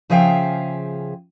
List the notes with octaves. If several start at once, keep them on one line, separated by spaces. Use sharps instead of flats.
C#3 F3 G#4 E5 F5 G5